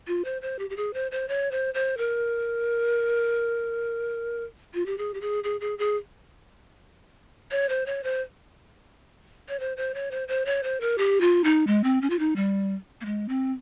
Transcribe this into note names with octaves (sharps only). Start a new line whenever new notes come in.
F4
C5
C5
G4
G4
G#4
C5
C5
C#5
C5
C5
A#4
F4
G4
G#4
G4
G#4
G#4
G#4
G#4
C#5
C5
C#5
C5
C#5
C5
C5
C#5
C5
C5
C#5
C5
A#4
G4
F4
D#4
G#3
C4
C#4
F4
D#4
G3
A#3
G#3
C4